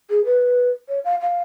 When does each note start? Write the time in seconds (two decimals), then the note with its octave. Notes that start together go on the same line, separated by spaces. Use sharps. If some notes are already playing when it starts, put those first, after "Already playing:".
0.10 G#4
0.25 B4
0.88 C#5
1.04 F5
1.21 F5